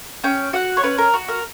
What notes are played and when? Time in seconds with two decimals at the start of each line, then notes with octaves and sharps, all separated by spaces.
0.24 C#4 G5
0.53 F#4 F#5
0.77 C#5
0.83 C#4 B4
0.98 A#4
1.14 F#4
1.28 A#4